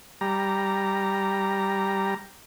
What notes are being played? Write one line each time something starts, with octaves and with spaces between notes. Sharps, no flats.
G3 A#5